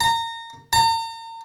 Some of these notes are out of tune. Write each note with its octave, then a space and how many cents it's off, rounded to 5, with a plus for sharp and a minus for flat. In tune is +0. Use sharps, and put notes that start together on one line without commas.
A#5 -25
A#5 -40